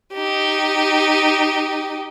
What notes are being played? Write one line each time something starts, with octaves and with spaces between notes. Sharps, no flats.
D#4 G4